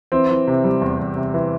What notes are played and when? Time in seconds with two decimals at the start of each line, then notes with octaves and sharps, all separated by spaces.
0.12 E3 C4
0.30 E3
0.47 C3
0.64 G3
0.82 E2
0.99 E2
1.16 C3
1.34 E3